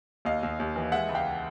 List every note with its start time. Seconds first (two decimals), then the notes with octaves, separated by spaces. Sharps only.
0.25 D#2 D#5 F5
0.43 D#2
0.60 D#2
0.76 E3
0.92 G#3 E5 F#5
1.09 C#2
1.15 F5 G5